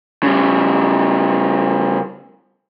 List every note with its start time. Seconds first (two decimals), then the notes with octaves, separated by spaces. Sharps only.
0.23 C#3 G3